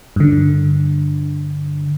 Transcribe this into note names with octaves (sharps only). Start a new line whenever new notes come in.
G2 D3